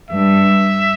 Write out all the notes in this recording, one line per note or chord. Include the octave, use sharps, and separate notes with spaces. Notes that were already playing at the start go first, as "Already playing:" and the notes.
G2 E5